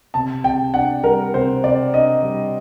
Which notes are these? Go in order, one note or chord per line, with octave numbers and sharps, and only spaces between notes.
C3 A5
C3 G5
D4 F#5
G3 A#4
C3 C5
C3 D5
D4 D#5
G3